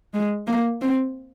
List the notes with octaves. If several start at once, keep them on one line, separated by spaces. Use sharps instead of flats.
G#3
A#3
C4